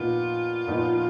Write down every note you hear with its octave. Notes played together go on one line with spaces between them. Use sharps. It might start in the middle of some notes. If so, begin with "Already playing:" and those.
Already playing: A#2 F3 B3 D#4 F4
A#2 F3 B3 D#4